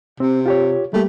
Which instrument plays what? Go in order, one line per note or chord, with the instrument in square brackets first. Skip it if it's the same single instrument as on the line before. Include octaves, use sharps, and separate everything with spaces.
[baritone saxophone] C3 [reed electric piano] C4
[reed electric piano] F4 G4 C#5
[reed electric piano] G3 A#3 G4 [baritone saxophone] A3